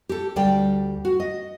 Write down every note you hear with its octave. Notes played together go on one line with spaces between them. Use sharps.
G4 A4
D2 G3 G4 D5 G5
F#4
D#5